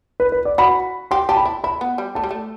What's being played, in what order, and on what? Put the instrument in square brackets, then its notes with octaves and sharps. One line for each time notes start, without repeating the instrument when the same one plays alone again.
[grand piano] B4
B4
D5
[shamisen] F#4 [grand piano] B5
[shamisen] G4 [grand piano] C6
[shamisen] G4 [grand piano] A5
[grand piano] B5
[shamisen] E4
[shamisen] E4 [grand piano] B5
[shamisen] B3
G3
[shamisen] A3 [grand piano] A5
[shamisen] G3
A3